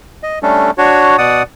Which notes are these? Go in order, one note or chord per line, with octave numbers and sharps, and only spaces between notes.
D#5
G3 A3 C#4 D4 A4
D4 F#4 C#5
B2 D5 F#5 D#6